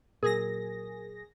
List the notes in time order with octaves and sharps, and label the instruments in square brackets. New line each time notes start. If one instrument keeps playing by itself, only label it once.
[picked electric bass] A#2 F#3 [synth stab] G#4 A#6 [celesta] A#4